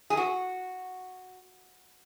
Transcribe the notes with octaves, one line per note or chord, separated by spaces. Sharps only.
G#4
F#4